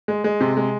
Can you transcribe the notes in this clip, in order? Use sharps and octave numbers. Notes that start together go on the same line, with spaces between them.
G#3
G#3
C3
G#3